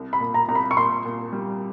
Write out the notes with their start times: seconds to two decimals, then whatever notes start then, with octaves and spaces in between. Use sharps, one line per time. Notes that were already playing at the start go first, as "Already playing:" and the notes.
Already playing: C2
0.13 B5
0.20 A#2
0.34 A#5
0.48 C2 A#5
0.55 B5
0.71 C#6
0.77 A#2 C6
1.05 A#2
1.33 G3